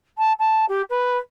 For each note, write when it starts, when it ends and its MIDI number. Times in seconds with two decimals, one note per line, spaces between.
0.18 0.32 81
0.39 0.65 81
0.68 0.82 67
0.89 1.17 71